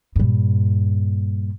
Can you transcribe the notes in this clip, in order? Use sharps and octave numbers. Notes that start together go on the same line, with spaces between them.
G2 A#2